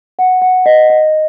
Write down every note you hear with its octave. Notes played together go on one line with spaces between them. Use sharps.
F#5
F#5
D#5
D#5